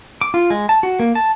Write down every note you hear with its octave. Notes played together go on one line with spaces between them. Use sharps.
D6
F4
G#3
A5
F#4
A#3
A5